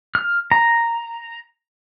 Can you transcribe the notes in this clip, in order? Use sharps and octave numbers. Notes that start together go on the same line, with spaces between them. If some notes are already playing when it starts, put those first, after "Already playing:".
F6
A#5